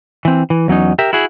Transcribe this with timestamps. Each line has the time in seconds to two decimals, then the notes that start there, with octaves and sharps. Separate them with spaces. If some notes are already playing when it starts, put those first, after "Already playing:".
0.25 E3 C4
0.50 E3
0.68 E2 F#3 C#4 D#4
0.99 G4 A#4 E5
1.13 E4 F#4 G#4